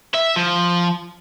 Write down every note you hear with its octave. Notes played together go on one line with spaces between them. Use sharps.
E5
F3